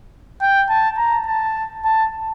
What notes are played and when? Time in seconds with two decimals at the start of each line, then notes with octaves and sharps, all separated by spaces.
0.41 G5
0.70 A5
0.98 A#5
1.26 A5
1.84 A5